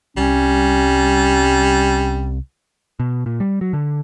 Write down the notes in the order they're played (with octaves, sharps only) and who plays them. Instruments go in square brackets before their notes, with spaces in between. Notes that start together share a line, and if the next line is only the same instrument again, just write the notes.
[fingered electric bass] C2 [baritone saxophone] G3 [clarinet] C#4
[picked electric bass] B2
A#2
G3
F#3
D3